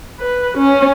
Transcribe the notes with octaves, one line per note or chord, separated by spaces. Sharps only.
B4
C#4